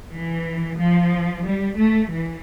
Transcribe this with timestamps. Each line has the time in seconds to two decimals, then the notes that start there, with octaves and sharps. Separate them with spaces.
0.11 E3
0.78 F3
1.45 G3
1.78 A3
2.11 E3